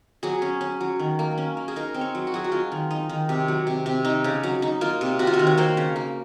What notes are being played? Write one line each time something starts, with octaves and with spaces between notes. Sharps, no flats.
F#3 G#4
C#4
C#4
F#3
D#3
A#3
C#4
A#3
G#4
D#4 A#4
C4
C#5
F#3
F#4
F#3 G#4
F#4
G#3 F4
D#3
D#4
D#3
C3
F#3
C3
C3
D#4
C#3
F#3
D#4
A#3 F4
C3
C3 F#4
F4
F#4
D#3
C#5
A#3 C5
C#3
A#3